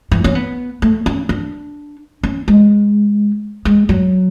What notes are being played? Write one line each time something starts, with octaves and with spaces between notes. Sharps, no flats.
E3
C#4
B3
A3
C#4
D4
C#4
G#3
G#3
F#3